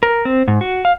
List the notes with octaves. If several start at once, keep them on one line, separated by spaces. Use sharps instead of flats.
A#4
C4
G#2
F#4
F5